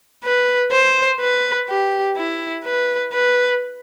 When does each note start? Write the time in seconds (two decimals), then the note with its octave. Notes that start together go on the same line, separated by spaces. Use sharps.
0.24 B4
0.72 C5
1.20 B4
1.69 G4
2.16 E4
2.65 B4
3.13 B4